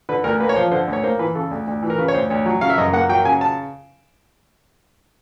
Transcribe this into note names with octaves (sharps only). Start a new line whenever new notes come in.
D3 B4
D2 A#4
A#3 B4
C#5
F3 C5
D3 C5
D2
C#5
A#3 C5
E3 B4
C#3 A4
D2
D2
E3
A#4
C#3 B4
C#5
D2 C5
D2 C#5
F#3
C#3 F5
E5
F#2 D#5
A#3 F#5
F#3 G5
C#3 G#5
A5